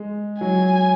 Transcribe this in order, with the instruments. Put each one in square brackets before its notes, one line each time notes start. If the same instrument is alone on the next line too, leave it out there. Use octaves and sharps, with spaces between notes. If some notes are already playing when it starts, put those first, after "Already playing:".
Already playing: [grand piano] G#3
[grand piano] F#3 [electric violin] G#5